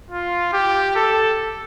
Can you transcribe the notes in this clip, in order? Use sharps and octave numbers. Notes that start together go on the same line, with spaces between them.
F4
G4
A4